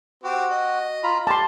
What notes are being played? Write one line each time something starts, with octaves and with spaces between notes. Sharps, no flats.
C4 F#4 G4
D#5
F4 A#5 B5
G4 A5 C6